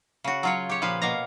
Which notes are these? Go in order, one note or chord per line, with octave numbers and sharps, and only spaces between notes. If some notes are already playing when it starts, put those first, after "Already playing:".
C#3 F#4
F#3 F4 C#5
G4 C#5
A#2 F3 B4 F5
B2 A#3 F5 A#5